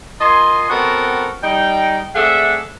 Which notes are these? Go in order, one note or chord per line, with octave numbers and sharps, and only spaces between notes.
F4 A#4 D#5 G#5 C6
B3 C4 F#4 A4 A#4
G3 D#4 G5
A3 C4 G#4 D5 E5 F#5